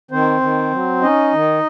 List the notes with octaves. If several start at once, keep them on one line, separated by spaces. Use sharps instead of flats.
D#3 C4 C5
D#3
F#3
C#4 D#4 D#5
D#3